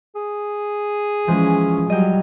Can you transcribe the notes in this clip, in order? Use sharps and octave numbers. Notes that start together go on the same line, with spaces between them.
G#4
E3 F3 G#3 C#4
F#3 G3 D#5 G5